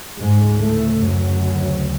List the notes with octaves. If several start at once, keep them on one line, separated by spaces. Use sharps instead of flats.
D2 G#2 C#3 G#3
A2 A3
F#2 F#3